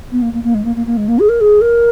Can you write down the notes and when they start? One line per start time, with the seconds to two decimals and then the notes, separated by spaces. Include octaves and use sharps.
0.11 B3
0.22 A#3
0.33 A#3
0.43 A#3
0.54 G#3
0.64 A#3
0.76 A#3
0.86 A#3
0.97 G#3
1.08 A#3
1.19 G#4
1.29 A#4
1.41 G#4
1.61 A#4